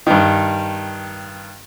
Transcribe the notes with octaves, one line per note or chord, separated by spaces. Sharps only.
G2 D#3